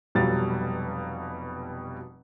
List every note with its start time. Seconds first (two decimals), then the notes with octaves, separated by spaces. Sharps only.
0.15 F1 B2 F#3 G3 F4 A6